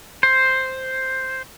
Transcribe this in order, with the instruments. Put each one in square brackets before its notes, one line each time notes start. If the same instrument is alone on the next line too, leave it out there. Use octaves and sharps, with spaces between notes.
[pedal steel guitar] C5